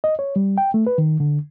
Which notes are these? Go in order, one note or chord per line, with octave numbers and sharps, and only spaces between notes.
D#5
C#5
G3
G5
A3
B4
D#3
D3